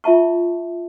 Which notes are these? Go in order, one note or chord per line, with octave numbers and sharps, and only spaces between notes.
F4 E5 A5 C#6